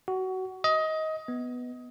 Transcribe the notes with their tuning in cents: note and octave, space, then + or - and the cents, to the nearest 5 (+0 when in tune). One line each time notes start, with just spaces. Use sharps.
F#4 +20
D#5 +20
B3 +0